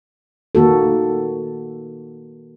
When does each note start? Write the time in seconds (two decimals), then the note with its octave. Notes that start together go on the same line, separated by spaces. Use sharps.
0.55 D#3 A#3 F#4 A4